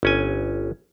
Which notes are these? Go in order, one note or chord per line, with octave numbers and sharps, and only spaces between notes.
G1 C#4 G#5